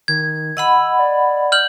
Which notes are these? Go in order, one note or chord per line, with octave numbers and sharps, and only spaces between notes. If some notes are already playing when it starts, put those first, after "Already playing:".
D#3 G#6
D#5 F#5 B5 E6
D5
F6 G6 F#7